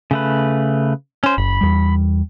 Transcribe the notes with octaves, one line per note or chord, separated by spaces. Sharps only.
C#3 A3 B4
C#4 C5
F#1 B5
E2 G3